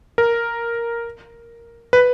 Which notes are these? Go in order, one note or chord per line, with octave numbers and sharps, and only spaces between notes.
A#4
B4